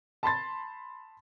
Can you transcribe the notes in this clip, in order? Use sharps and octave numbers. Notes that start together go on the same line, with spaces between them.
A5 B5 C6 A6